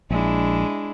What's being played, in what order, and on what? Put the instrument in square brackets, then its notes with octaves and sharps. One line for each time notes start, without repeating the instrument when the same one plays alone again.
[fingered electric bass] A#1 [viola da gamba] G#3 D4 E4